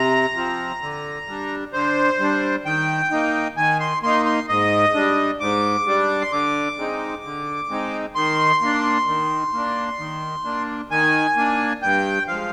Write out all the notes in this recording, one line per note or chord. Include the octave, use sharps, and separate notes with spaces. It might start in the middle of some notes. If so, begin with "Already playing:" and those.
Already playing: C3 A#5
F3 C4
D3
G3 D4
D3 C5
G3 D4
D#3 G5
A#3 D#4
D#3 G#5
C6
A#3 D#4 C6
C6
G#2 D#5
G3 D4
G#2 D6
G3 D4
C6
D3 D6
G#3 C4 D#4
D3
G#3 C4 D#4
D#3 C6
A#3 D4
D#3
A#3 D4
D#3
A#3 D4
D#3 G#5
A#3 D4
G2 G5
F3 G#3 F5